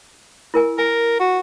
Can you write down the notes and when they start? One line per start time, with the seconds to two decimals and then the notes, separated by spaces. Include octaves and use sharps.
0.54 E4 A#4 G#5
0.78 A#4 G#5
1.20 F#4